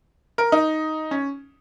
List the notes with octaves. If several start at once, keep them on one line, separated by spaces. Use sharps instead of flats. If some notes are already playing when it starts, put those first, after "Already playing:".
A#4
D#4
C#4